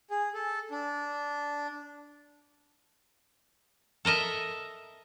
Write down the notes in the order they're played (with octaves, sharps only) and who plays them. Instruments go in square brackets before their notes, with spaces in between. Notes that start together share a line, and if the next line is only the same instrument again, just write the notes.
[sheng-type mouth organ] G#4
A4
D4
[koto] A4 A#4 D#5 E5